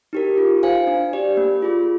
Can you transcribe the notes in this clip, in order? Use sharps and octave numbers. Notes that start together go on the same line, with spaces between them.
D#4 G4 A#4
F4
C5 F5 G#5
D4
G4 D5
A#3
F4 G#4